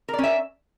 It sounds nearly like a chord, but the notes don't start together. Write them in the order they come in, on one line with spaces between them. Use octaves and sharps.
A#4 D5 C#4 E5